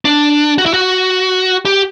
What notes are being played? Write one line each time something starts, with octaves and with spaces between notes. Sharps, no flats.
D4
F#4
E4
F#4
G4